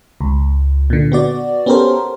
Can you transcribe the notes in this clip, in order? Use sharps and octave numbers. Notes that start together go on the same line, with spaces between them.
C#2
A#2 D3
B3 F#4 D5
B3 C#4 G4 A4 A#4 C5